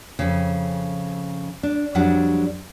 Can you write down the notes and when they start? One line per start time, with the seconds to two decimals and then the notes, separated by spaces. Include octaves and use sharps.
0.19 F2 C#3
1.63 D4
1.95 F2 F#3 G3 D4 F#5